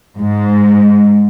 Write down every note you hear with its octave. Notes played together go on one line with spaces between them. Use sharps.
G#2